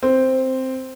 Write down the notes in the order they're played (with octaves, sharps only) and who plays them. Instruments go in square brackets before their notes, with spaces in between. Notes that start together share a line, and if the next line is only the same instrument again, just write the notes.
[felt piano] C4